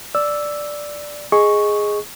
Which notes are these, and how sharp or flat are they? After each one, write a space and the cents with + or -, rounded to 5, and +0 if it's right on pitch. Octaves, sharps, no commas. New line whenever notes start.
D5 +0 E6 +0
G#4 +0 D#5 +0 C#6 +0